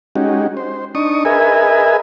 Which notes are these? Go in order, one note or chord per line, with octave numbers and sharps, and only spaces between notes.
G#3 C#4 D#4 F#4 G4
C5
D4 D#4 C#6 D#6
G#4 A#4 B4 D#5 E5 G#5